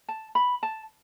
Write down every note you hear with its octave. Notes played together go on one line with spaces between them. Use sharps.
A5
B5
A5